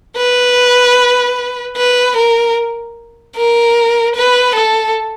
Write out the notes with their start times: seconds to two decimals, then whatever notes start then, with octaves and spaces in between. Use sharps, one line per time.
0.17 B4
1.77 B4
2.16 A#4
3.37 A#4
4.16 B4
4.55 A4